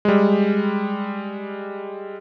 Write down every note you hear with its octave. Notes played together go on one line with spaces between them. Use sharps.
G3 G#3